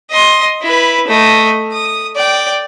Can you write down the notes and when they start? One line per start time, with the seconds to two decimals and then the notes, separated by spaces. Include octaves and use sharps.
0.11 D#5 C6
0.62 E4 B4
1.08 A3 D#5
1.73 D#6
2.17 D5 G5